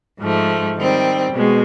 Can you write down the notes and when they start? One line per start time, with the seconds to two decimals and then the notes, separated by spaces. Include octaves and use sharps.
0.19 G#2 F3 A3
0.77 D#3 G3 C4
1.33 B2 G#3